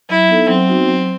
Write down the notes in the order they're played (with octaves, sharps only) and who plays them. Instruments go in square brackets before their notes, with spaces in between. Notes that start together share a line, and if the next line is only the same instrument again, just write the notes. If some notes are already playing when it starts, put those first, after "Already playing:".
[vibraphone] F#3 [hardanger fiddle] E4
[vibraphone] B3 D#4 A4
[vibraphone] F#3 [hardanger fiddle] C4
[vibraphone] B3 D#4 F#4
F#3